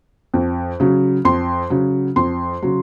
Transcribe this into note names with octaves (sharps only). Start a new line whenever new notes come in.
F2
C#3 F#3
F2 C6
C#3 F#3
F2 C6
C#3 F#3